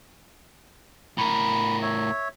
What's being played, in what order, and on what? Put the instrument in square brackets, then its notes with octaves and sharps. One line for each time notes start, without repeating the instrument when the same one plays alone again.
[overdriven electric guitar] A2 A#4 [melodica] B5
[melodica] C#5 E5